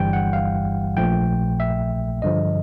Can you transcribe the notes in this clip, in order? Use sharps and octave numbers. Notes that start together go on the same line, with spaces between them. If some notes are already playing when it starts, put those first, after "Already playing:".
Already playing: G1 G2 E3 G3 G5
F#5
F5
A#1 A#2 F3 A3 G5
E5
G2 D3 F3 D#5